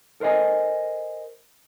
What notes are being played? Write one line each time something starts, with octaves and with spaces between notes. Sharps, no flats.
A4 A#4 C5 D#5 G#5